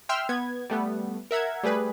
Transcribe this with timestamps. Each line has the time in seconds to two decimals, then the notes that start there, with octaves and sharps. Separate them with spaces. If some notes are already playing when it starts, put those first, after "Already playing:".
0.09 E5 G5 C6 E6 F6
0.29 B3 G#6
0.70 G3 A3 B3
1.31 A#4 E5 F#5 G#6
1.63 G3 A3 G#4 B4